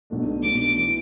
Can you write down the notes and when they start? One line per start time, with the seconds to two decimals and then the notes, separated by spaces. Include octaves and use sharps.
0.10 B1 B2 A3 D4
0.43 B1 B2 A3 D4 D6
0.77 E3